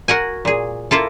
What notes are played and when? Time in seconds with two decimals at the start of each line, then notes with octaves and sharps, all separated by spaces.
0.08 F#4 A#4 F#5 G#5
0.45 A#2 G#4
0.91 A#3 E4 F4 A4